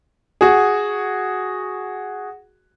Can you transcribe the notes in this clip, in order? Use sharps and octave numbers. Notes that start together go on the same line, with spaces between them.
F#4 G#4